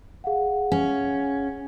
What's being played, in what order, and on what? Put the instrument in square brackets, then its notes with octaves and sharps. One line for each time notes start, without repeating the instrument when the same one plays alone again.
[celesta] G#4 F5 F#5
[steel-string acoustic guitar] C#4